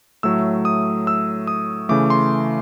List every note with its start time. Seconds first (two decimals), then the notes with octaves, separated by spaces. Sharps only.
0.23 A2 F#3 A3 E6
0.65 D#6
1.07 E6
1.47 D#6
1.89 C#3 E3 A3 D6
2.10 C6